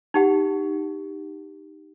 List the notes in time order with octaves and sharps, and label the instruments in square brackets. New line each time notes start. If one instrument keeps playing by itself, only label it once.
[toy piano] D#4 G4 F#5